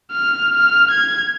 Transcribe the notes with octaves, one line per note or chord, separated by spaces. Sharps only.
F6
F6
G#6